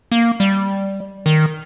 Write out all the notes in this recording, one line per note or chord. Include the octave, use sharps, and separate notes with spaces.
A#3
G3
D#3